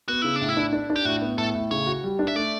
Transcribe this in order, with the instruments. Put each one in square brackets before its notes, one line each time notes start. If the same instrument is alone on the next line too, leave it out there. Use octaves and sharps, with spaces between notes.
[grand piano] B3 [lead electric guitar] F#4
[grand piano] C#3 [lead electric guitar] E4
[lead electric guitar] D4
[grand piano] A2
[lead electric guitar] E4
[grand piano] D4
D4
D4
[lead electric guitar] G4
[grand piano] A2 [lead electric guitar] F#4
[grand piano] B3
[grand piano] A2 [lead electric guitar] A4
[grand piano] A2
[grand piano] C#3 [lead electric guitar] C#5
[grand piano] F#4
G3
D4
[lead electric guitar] E5
[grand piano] A3 [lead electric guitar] D5